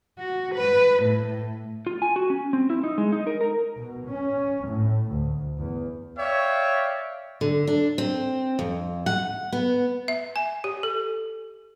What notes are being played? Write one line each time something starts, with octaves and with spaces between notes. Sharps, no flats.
F#4
B4
A2
F4
G#5
F#4
C#4
C4
E4
D#4
G#3
D#4
A#4
A#4
B2
C#4
A2
D2
E2
C#5 D5 E5 F5 G5
D3
D4
C4
F2
F#5
B3
E5
G#5
G4
A4